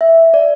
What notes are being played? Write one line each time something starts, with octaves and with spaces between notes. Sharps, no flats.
E5
D5